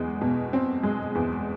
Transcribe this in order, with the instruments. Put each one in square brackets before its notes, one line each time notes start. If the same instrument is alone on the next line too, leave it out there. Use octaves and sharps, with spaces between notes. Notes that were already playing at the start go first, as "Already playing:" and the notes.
Already playing: [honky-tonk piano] E2 G#3
B2
C4
G#3
E2